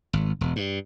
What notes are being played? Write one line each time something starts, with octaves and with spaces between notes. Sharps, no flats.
G#1
E1
G2